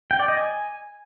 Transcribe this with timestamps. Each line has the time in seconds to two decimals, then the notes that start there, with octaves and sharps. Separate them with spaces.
0.11 G5
0.20 D5
0.28 D#5
0.37 G#5